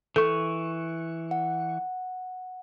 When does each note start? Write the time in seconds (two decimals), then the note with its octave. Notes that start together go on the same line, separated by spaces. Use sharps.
0.16 E3 A4 C#6
1.31 F#5